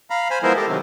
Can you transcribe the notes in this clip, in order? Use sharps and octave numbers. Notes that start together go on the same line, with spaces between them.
F5 A#5 B5
C5 G#5 B5
F3 G#3 B3 E4 A#4 C5
G4 A4 D#5
C3 D#3 F#3 G#3 A3 C4